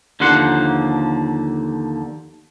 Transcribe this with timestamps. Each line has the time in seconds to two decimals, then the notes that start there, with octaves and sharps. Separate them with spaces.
0.20 D#2 D3 F3 A#3 F#5 C6